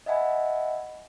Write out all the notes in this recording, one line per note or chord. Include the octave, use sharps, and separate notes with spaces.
D#5 E5 F#5 G#5 B5